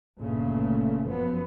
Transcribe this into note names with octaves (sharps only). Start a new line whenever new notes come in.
G1 A#2 C#3 A3
F#2 F3 B3